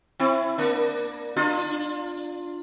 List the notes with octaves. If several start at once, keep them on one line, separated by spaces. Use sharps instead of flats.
C4 E4
A#3 D4
D4 F4